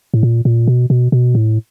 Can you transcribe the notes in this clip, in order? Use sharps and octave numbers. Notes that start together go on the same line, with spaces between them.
A2
A#2
A#2
B2
B2
B2
A2